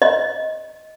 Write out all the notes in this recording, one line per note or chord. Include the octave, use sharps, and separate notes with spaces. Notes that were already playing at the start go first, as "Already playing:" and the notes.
D#5